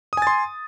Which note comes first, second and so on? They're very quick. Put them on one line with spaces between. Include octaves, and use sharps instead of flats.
D#6 G#5 A6 C6